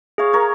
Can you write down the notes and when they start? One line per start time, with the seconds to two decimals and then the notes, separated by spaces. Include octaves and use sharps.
0.18 G#4 C#5 F5
0.33 A#4 C#5